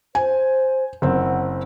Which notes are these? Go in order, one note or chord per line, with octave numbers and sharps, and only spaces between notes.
C5 G#5
F#1 C4 F#5